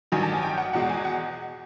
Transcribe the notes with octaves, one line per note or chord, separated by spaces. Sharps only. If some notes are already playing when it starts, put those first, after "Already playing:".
A1 G2 D#3 F#3 G#5
A5
G#5
G5
F#5
E2 B2 G#3 F#5
G#5
F#5